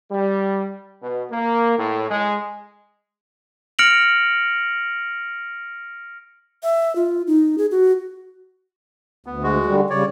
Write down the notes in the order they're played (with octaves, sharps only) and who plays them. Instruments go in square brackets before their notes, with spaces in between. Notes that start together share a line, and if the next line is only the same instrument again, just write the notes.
[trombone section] G3
B2
A#3
A2
G#3
[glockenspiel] F6 A#6 C#7 D7 F7 F#7
[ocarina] E5
F4
D#4
G#4
F#4
[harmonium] D2 [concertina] B3
[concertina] G#3 F#4
[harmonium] D3 G3
[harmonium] C#3 G3 [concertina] C#5 D5